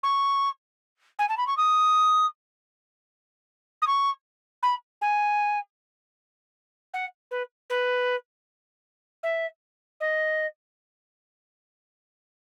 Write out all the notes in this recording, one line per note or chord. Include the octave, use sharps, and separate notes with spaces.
C#6
G#5
A5
B5
C#6
D#6
D#6
C#6
B5
G#5
F#5
B4
B4
E5
D#5